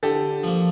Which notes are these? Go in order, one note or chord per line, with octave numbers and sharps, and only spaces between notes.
D3 G4 A4
F3 A#3